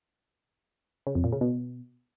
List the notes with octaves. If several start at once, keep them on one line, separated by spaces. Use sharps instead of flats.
C#3
F2
A#2
C#3
B2